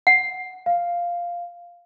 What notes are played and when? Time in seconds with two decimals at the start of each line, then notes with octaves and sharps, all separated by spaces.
0.07 F#5
0.66 F5